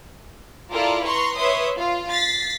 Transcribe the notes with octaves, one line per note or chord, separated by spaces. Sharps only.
E4 F4 A4 A#4 D5
B4 A#5 C6 C#6
B4 C#5 E5 C6 D#6
F4
A6 B6 C7